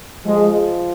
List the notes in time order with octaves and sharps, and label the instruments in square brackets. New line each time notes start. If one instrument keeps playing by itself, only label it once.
[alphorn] F3 [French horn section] G#3